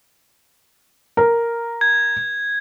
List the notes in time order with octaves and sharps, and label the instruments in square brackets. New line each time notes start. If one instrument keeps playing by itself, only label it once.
[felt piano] A#4
[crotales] G#6